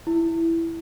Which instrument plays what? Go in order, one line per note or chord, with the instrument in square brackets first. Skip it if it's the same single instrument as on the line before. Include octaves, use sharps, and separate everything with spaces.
[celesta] E4